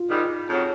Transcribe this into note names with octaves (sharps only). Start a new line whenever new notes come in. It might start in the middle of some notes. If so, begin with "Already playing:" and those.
Already playing: F4
G#2 D#3 G3
F2 C#3 F#3